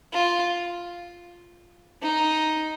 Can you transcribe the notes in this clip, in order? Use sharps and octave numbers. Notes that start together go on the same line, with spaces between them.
F4
D#4